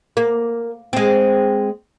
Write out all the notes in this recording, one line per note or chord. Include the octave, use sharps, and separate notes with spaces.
A#3
G#3 C4